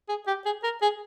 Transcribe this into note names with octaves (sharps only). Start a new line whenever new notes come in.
G#4
G4
G#4
A#4
G#4